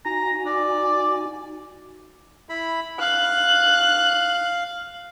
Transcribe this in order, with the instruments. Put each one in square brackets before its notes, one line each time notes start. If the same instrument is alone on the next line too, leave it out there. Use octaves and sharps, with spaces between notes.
[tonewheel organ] D#4 F#4 G#5 [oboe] A#5
[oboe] D5
[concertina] E4 B5
[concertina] F5 [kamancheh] F#6